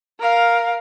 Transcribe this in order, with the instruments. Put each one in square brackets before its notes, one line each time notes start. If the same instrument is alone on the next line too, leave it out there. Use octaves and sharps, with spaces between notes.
[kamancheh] A#4 F5